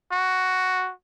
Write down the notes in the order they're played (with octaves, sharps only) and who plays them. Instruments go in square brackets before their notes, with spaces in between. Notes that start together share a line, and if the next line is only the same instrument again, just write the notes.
[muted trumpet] F#4